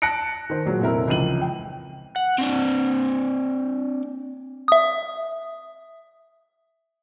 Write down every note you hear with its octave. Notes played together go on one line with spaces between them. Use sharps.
A5 F#6 A#6 C#7 D7
D#3 C5
A#2 F#3 G#3
F1 C4 E4 A#4
C#2 E3 F3 D#7 F#7
G5
F#5
C4 D4
E5 D#6